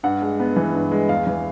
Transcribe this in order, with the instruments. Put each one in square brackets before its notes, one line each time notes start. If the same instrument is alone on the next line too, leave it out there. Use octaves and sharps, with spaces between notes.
[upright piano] G2 F#5
G#3
B3
E3
G2
G#3
E2 F5
E3